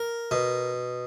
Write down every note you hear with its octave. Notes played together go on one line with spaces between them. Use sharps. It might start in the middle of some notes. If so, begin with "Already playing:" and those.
Already playing: A#4
B2